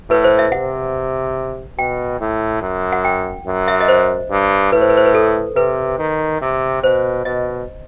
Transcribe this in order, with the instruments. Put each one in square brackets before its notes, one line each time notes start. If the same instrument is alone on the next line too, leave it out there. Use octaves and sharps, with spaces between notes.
[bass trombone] A2 [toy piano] B4
[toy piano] C5
E5
[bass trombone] C3 [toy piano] F#5
[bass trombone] B2 [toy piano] G5
[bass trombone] A2
F#2
[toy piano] F#5
G5
[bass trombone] F#2
[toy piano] E5
D#5
C5
[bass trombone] G2
[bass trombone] A2 [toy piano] B4
[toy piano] C5
B4
C5
B4
A4
[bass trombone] C3 [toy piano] B4
[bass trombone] D#3
C3
[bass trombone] B2 [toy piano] C5
[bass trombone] B2 [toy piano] D#5